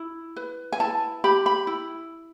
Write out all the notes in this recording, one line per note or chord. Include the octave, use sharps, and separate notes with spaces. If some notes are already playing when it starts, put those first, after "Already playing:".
Already playing: E4
B4
G#5
E4 A5
G4 B5
B5
E4